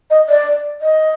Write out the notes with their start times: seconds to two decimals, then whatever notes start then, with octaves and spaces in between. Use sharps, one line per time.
0.11 D#5
0.29 D5
0.82 D#5